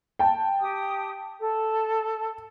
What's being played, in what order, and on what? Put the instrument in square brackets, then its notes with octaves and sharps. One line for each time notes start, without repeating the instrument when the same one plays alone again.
[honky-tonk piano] G5 A5
[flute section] G4 D#6
A4